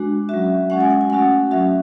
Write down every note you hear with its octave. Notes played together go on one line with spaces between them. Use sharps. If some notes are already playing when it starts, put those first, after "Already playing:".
Already playing: G#3 D4 F#4
F#3 C#4 F#4 E5
G#3 C#4 F#4 F#5
G#5
F#5
G#5
A3 C#4 F#4 F#5
F#3 C#4 F#4 E5